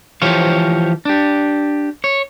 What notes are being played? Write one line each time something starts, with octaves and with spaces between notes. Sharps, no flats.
E3 F3 G4 C5 C#5 F5
D4 G4
C#5